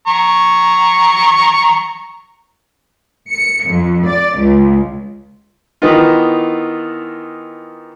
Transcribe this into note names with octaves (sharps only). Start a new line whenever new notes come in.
A#5 C#6
C#7
F2
D5
C#2
D#3 E3 B3 D#4 F4